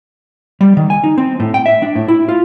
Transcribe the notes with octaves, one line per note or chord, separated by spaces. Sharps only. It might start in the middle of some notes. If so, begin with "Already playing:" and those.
G3
D#3
G#5
D#4
C4
A2
G5
E5
D4
A2
E4
F4